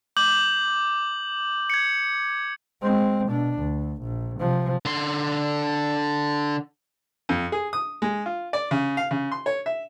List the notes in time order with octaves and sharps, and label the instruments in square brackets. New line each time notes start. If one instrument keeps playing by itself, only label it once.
[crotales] D6 G6 F#7
G#6 C#7
[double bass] G#3 C4
B2 D4
D2
A#1
C3 F3
[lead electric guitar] D3 C6
[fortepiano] F2
G#4
D#6
G#3
F4
D5
C#3
F5
C#3
C6
C#5
E5